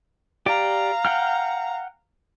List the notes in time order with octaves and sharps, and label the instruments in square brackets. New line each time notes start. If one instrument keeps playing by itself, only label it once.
[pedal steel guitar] G4 D5 [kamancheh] F5 A#5
[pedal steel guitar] F#5 G5 F6